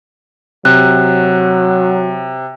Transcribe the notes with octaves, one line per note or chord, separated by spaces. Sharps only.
C3 F#3 F#6